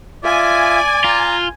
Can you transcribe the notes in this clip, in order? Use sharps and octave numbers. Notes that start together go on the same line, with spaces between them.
F4 D5 E5 G#5
F4 A#5